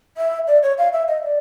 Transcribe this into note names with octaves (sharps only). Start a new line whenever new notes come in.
E5
D5
C#5
F5
E5
D#5
D5